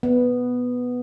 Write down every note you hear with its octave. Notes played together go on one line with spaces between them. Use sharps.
B3